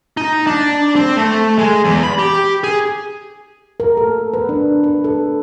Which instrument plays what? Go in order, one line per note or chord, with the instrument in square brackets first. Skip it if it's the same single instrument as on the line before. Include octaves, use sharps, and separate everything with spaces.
[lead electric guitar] D#4
D4
C4
A3
G#3
E2
B5
G4
G#4
[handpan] A#4
A4
B4
D4
B4
A4